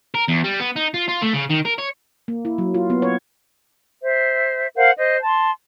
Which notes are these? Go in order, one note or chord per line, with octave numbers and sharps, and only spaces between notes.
A#4
E2
G3
B3
D#4
F4
F4
A3
C#3
D#3
A#4
C#5
A#3
E4
F#3
F4
B3
C#5
C5 E5
A#4 C5 F5 F#5
C5 D#5
A5 C6